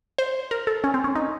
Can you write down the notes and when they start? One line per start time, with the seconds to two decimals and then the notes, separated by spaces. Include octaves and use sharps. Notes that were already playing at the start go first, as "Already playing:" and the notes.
0.18 C5
0.51 A#4
0.67 A4
0.84 C#4
0.94 C4
1.04 C#4
1.15 D#4